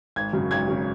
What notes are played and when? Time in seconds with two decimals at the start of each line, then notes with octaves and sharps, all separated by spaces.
0.16 G#1 G#6
0.33 F#2 C#3 F#3
0.51 G#1 G#6
0.68 C#3 F#3